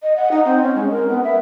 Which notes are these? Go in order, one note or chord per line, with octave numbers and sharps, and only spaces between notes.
D#5
F#5
D#4
C4
C#4
G#3
A#4
B3
E5